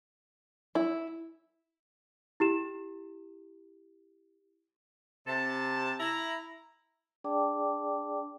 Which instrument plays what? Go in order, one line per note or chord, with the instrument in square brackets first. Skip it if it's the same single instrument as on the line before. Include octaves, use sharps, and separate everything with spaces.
[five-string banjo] E4
[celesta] E4 G4 E7
[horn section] C3 A5
E4 A#5
[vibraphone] D4 G#4 D5 G5 A5 D6